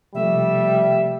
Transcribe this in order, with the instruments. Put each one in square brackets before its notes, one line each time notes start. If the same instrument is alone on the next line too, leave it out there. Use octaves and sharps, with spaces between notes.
[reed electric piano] C3 F3 A3 [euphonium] G3 [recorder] E5